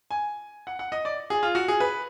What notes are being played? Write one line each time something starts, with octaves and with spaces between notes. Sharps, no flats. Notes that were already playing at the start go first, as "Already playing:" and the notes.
G#5
F#5
F#5
D#5
D5
G#4
F4
F#4
G#4
B4